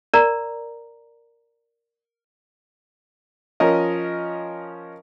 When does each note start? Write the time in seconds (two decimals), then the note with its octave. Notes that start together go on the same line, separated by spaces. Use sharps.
0.14 A#4 D5 A#5
3.60 F3 C#4 A#4 D#5